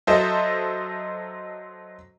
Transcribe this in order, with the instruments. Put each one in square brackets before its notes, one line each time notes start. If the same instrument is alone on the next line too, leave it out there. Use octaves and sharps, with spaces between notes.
[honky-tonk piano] F#3 A4 C5 D#5 E5